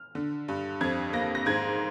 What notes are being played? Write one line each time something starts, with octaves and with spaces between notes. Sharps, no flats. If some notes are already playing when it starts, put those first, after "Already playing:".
Already playing: F6
D3
G2
F2 G#6
A#3 A#6
A#6
G#2 G#6